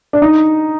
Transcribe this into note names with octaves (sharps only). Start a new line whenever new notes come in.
D4
D#4